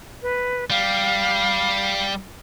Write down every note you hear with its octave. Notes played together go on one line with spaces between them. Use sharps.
B4
G3 F5